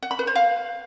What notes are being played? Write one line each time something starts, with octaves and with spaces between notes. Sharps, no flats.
F#5
B5
B4
C5
F5